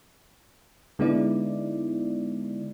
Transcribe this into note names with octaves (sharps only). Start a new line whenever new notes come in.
D3 G#3 B3 D#4 E4 D5